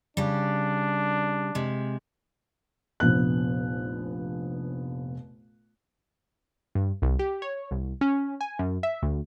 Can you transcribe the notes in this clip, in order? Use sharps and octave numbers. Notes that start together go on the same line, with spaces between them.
C#3 G3 D4
C3 G#3
F1 A#1 B3 F#6
G2
C2
G4
C#5
C2
C#4
G#5
F#2
E5
D2